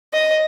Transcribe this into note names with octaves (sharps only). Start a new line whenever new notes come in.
D#5